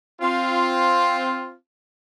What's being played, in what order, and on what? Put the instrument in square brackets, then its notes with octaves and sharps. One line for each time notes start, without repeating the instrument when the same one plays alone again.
[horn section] C4 F4